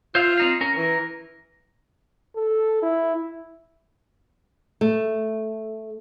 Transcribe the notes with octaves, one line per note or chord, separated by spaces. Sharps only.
F4 C5 E5 F5
C4 D#4 F5
C#4 A#4
E3 A#4
A4
E4
A3